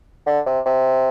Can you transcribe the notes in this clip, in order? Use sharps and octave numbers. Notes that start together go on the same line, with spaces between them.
D3
C3
C3